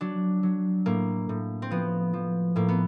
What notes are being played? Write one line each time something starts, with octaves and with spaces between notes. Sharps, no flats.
F#3 D4
F#3
A2 A#3
A2
C4
F3 B3
F3
A2 A#3
B3